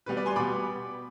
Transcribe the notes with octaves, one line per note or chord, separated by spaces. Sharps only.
B2 G3 B3 B4
B4 D5
G#5 C6
B2 G3 B3 B5 D6